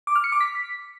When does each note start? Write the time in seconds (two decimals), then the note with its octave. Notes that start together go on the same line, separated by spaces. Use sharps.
0.07 D6
0.16 F6
0.24 C#7
0.32 D6
0.41 B6